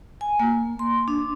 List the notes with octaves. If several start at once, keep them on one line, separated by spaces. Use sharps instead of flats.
G#5
A#3
C6
D4